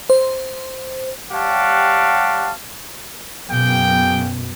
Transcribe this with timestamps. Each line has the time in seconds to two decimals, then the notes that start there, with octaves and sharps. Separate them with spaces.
0.10 C5
1.32 G3 G4 C#5 F5 F#5 A5
3.49 F#2 B2 A#3 G#4 G5